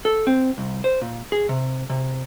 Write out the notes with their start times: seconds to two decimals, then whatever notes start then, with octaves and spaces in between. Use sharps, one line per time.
0.05 A4
0.27 C4
0.58 C2
0.84 C5
1.02 A#2
1.32 G#4
1.49 C3
1.90 C3